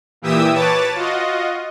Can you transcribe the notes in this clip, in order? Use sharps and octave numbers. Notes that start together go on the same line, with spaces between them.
A#2 E3 G4 E5 D#6 E6
B4 C#5 A5 D6 A6
F4 F#4 D#5